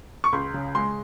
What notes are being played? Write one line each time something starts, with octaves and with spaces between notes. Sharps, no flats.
C#6
C#2 C6
C#3
G#3 C6